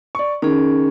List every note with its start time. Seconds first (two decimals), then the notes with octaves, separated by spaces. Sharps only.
0.15 D5 C#6
0.42 D#3 C#4 G#4